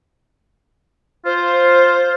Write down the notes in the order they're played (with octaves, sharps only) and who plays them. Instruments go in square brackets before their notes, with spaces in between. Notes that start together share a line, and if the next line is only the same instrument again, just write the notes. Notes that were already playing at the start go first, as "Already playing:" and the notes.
[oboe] F4 [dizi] C5